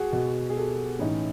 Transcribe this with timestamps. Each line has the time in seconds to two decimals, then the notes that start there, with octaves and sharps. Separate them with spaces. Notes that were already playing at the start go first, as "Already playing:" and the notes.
Already playing: F#4 G#4
0.12 B2
0.50 G#4
0.57 G4 A4
0.99 A2 E3 C#4 D#4